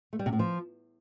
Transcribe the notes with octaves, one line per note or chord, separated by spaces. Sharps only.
A3
G3
C3
A2
F3